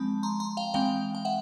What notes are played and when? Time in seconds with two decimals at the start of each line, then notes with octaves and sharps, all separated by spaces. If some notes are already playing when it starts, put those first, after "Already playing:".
Already playing: F3 G#3 C4 A5 B5
0.23 A#5 C6
0.40 A#5 C6
0.57 F5 G5
0.74 E3 G#3 C4 F5 G5
1.15 G5
1.25 E5 F#5